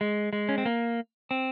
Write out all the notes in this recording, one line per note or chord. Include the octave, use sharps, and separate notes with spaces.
G#3
G#3
C#4
C4
A#3
C4